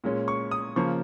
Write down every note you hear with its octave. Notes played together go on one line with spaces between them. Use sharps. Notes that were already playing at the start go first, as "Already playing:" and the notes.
A#2 G#3 C#4
C#6
D#6
C#3 F3 A#3 C#6